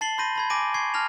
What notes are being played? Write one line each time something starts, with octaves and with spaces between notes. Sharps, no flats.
A5 A6 C7 F#7 G7
B5 C6 G6 A#6 D#7
A5 B5 G#6
G#5 D6 A#6 D7 D#7
C#6 G#6 C7
A5 F6 G#6 A#6 F7